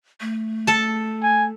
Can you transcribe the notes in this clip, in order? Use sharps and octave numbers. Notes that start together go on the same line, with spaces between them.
A3
A4 A5
G#5